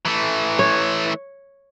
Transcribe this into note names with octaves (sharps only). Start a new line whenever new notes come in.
E3 A3
C#5